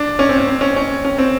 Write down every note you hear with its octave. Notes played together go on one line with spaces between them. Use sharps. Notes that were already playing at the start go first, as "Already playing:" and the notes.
Already playing: D4
C#4
C4
C#4
C4
C#4
C#4
C#4
C4